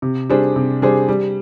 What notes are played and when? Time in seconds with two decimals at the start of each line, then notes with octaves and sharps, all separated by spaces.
0.02 C3
0.30 G3 D4 G#4 C5
0.56 C3
0.82 G3 D4 G#4 C5
1.09 G3